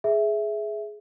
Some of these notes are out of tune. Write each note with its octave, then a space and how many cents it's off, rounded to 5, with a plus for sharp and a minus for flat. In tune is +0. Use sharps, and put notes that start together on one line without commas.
G#4 +15 E5 +0